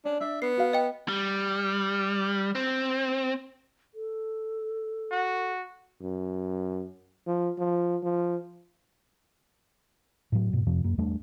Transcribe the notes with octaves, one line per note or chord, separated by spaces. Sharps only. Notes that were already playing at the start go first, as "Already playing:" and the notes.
C#4 D4
D4 E5
B3 C7
F#4 F5
D#5 G5
G3
C4
A4
F#4
F#2
F3
F3
F3
A2 F#3
G#2 B2
F2 C3 F3
F#2 A#3
E2 G3 A3 D4